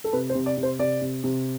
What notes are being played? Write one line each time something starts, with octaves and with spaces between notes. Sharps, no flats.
A4
C3 B4
C5
C3
D5
C3
C5
C3 D5
C3
C3